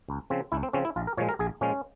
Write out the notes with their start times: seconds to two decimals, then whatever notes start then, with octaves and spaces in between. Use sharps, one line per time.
0.09 C#2
0.30 C#3 F3 C4
0.52 C#2 E4
0.63 C4
0.73 C#3 F3 C4 C#4
0.85 E4
0.96 A#1 F4
1.07 A#4
1.17 A#2 F3 G#3 C#5
1.29 A#4
1.39 A#1 G#4
1.61 A#2 F3 G#3 C#4